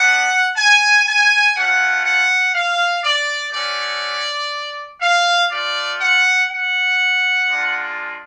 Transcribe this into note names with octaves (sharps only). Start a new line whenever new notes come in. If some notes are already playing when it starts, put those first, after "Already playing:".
Already playing: B3 D4 F#4 F#5
G#5
G#5
A3 C#4 F4 F#5
F#5
F5
D5
A3 C#4 F#4 D5
F5
A3 F4 D5
F#5
F#5
G#3 D4 F4